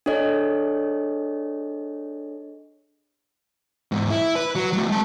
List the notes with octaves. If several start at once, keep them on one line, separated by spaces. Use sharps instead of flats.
D4 G#4 A4 C#5 D#5
E2 G#2
E4
B4
F#3
F#3 A3
G#3 A5